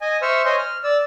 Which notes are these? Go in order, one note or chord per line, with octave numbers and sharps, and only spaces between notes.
D#5 G#5
C5 E5 C#6 E6 F6
C5 C#5 D#5 G#5 C6
F6
D5 E6